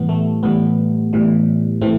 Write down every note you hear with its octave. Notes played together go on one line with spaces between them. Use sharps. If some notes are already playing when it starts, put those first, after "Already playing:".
Already playing: A2 E3 G3 B3
A3
A2 E3 G3 B3
A2 E3 G3
A2 E3 A3 C4